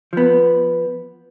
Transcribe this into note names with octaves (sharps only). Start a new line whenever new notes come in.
F3 B3